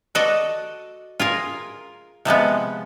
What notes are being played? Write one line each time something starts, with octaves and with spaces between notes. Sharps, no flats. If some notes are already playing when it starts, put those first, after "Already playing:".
F#4 A4 D5 D#5
F4 G#4 A#4
C3 F3 G#3 B3